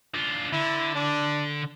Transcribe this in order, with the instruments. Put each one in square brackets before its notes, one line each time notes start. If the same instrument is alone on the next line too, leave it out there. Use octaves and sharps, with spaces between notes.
[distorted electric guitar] D3 F4
[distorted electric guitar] D3 [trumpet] E4
[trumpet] D4